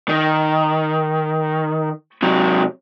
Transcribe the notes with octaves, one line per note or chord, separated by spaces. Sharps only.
D#3
C3 F#3